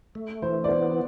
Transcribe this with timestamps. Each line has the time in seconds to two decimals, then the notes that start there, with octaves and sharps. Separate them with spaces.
0.15 A3
0.42 E3 C5
0.64 D5
0.69 B3 C5